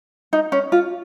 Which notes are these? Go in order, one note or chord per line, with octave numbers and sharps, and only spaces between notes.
D#4
C#4
F4